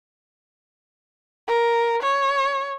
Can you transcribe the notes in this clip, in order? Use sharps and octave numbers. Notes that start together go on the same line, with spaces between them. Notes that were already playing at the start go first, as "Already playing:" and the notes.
A#4
C#5